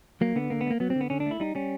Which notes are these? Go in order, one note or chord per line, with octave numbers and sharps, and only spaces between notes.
F#3 A#3
D3 B3
D3 A#3
B3
A3
A#3
F#3 B3
C4
D3
B3
D3 C#4
D4
A3
E4
G3 D#4
G3 C#4